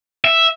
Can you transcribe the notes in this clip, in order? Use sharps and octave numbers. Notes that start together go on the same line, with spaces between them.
E5